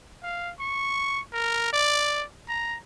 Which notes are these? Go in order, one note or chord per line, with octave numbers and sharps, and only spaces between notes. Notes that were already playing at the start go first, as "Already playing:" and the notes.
F5
C#6
A#4
D5
A#5